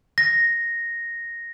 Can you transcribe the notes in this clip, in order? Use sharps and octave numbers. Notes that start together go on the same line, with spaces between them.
A#6